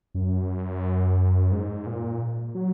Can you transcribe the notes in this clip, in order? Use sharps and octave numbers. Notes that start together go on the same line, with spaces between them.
F#2
G#2
A#2
F#3